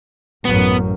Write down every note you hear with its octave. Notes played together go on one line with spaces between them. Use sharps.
A1 F#2 B3